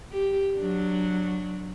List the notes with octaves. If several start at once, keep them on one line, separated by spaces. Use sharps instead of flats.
G4
F#3 D4